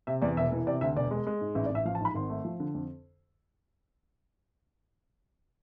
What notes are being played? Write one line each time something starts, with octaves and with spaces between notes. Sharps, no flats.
C3 E5
E2 D5
E1 E5
E3
C3 D5
D2 E5
E1 D5
G#3
G#3
G#2
A1 E5
D5
A1
E5
F3 F5
A5
G#2 B5
G#1 C6
A3
F3
D3
F2